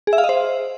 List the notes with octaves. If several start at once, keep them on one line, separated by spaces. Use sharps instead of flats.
G#4
E5
F5
D#5
C5